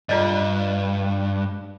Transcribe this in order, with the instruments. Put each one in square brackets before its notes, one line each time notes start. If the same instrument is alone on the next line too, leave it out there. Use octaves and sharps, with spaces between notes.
[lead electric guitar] G2 [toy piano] F4 D5 D#5